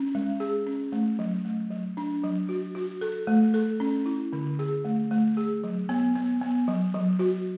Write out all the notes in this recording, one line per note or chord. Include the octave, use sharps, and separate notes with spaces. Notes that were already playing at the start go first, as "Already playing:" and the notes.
Already playing: C#4
G#3
G#4
C#4
A3
F#3
A3
F#3
D4
F#3
F#4
F#4
A4
A3
A4
C#4
E4
D3
G#4
A3
A3
G#4
F#3
B3
B3
B3
F#3
F#3
F#4